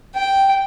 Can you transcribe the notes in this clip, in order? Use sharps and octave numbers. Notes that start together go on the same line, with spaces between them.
G5